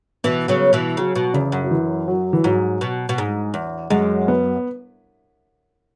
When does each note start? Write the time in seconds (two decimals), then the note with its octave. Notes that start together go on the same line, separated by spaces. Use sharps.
0.24 B2 E3 B3
0.48 C#3 F#3
0.73 B2 E3
0.97 C#3 F#3
1.15 B2
1.34 E2 C#3
1.52 F#2
1.64 F#3
1.71 E3
2.08 F#3
2.33 E3
2.44 G#2 F#3
2.81 B2
3.09 B2
3.18 G#2
3.54 E2
3.90 F#2 G#3
4.28 B3